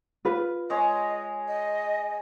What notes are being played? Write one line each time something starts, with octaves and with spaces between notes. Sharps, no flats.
F4 B4
G#3 G#4 C#5 D#5
D#5